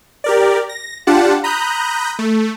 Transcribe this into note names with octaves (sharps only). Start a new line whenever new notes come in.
G4 A#4 D5
A#6
D4 F4 G4 F#5 A5
A#5 B5 D#6 F#6 G6
A3